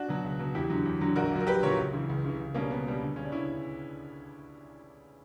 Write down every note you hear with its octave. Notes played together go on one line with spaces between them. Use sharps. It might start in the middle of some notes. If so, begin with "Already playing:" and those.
Already playing: D4 F#4
B2 F#3
C#2
B2 F#3
E2 E4 G4
D3 F#3
E2
D3 F#3
A#1 F#4 A#4
A#2 F#3
A#4
A#1 G4 B4
A#2 F#3 A#4 C#5
C#2
C#3 E3
C#2
C#3 E3
C#2
B2 G3 A#3 C#4
C#2 B3
B2 G3
D2
C#3 G3 C#4
D4
D2 C#4 E4